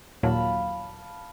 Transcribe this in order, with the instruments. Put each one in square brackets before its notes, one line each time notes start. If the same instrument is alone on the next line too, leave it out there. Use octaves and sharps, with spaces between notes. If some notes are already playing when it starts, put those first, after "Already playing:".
[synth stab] D#2 A#2 F#3 [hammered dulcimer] F5 A5 B5